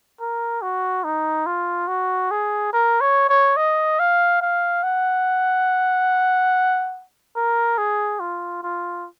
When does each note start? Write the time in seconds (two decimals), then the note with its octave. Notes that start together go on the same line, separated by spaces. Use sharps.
0.20 A#4
0.62 F#4
1.04 D#4
1.46 F4
1.88 F#4
2.31 G#4
2.73 A#4
3.01 C#5
3.29 C#5
3.57 D#5
4.00 F5
4.41 F5
4.83 F#5
7.36 A#4
7.78 G#4
8.20 F4
8.63 F4